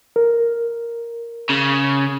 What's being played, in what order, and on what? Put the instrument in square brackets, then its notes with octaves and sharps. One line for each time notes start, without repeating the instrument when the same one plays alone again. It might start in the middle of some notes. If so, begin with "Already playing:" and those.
[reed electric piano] A#4
[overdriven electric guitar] C#3